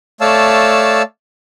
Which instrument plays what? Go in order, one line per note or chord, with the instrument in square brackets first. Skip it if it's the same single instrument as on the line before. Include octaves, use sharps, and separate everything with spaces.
[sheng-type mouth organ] A3 C#5 D5 F5 A5 E6